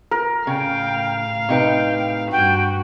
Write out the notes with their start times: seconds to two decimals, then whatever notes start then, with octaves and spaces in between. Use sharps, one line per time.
0.11 A#4
0.47 A2 C#3 F5 G5
1.49 C3 D#4 B4 G5
2.32 G2 F#4 G5